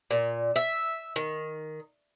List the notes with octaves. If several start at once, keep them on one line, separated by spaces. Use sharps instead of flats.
A#2
E5
D#3